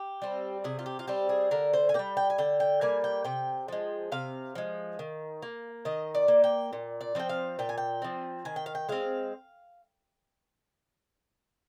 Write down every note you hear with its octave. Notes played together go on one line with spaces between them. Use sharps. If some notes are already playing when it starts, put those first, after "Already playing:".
Already playing: G4
G3 C4
C3 G#4
F4
G4
F4
G3 C4 G4
G#4
D3 A#4
C5
G#5
G3 A#3 G5
G5
G#5
D3 G5
G5
G3 A#3 G#5
G5
C3 G5
F3 G#3
C3 F5
F3 G#3
D#3
A#3
D#3 D#5
D5
A#3
G5
A#2
D5
F3 C4 G5
F5
A#2 G5
G#5
G5
F3 C4
D#3 G#5
G5
F5
G5
G#3 C4 F5